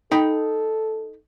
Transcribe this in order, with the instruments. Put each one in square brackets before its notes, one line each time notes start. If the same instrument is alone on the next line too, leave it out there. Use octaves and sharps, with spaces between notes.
[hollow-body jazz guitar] D#4 G5 B5 [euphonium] A4